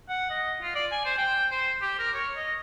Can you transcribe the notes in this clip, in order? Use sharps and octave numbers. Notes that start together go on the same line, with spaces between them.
F#5
D#5
F4
D5
G#5
C5
G5
C5
G4
A#4
C#5
D#5